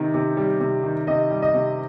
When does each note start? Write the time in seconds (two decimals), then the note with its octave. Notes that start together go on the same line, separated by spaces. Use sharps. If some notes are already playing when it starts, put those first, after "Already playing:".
Already playing: C3 D#3
0.14 C3
0.37 G3
0.60 C3
0.83 D#3
1.07 C3 D#5
1.30 G3
1.42 D#5
1.54 C3